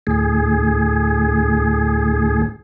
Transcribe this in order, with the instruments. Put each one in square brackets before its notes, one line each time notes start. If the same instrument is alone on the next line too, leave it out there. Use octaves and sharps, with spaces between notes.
[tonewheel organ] D2 A2 G#4